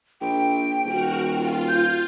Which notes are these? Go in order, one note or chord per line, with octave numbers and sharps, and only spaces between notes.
A#1 G5
D#1 F#4 F6
F4
G6